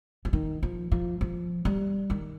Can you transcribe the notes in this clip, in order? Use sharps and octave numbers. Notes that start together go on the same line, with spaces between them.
F3
D#3
F3
F3
F3
G3
D#3